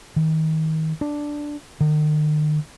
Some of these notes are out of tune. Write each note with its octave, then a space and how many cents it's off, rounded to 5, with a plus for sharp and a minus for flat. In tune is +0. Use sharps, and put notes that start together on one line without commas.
D#3 +30
D4 +0
D#3 -40